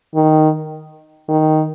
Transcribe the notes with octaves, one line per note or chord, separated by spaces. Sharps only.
D#3
D#3